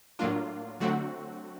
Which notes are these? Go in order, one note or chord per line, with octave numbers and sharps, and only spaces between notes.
A2 F#3 A#3 D4 F4
D3 F#3 A3 C4 F#4